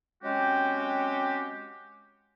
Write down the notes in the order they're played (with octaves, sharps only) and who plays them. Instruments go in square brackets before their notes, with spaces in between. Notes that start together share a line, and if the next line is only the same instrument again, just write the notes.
[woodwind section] F#3 G#3 C4 C#4 F#4 G4